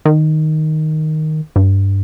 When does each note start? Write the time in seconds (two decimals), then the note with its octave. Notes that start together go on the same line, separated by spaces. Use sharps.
0.05 D#3
1.56 G2